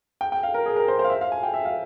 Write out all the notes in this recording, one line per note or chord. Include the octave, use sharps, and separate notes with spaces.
G5
G5
F5
A#4
G#4
A#4
C5
C5
F5
E5
F5
G#5
G5
E5
F5